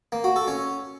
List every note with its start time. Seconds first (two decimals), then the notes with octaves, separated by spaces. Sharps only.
0.12 A#3
0.24 F#4
0.36 A4
0.48 C#4